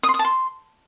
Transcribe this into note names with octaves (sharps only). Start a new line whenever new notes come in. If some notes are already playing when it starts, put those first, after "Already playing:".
D#6
C6
D#6
A5
C6